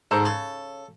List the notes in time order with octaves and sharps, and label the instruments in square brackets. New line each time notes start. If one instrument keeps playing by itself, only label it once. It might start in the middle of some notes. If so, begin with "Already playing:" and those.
[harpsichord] G#2 [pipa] A4 A#4 C5
[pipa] C#3 [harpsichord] A4